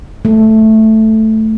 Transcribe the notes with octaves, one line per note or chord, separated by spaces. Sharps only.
A3